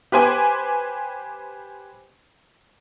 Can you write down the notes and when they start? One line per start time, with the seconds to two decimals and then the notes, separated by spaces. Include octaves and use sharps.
0.12 G4 B4 C5 G#5 D6